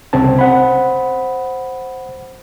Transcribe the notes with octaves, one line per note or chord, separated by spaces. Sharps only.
C2 C#3 C4 A5
C5 F#5 B5